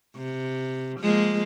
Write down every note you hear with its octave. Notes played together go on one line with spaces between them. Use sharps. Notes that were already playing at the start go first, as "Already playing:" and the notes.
C3
F3 G#3 A#3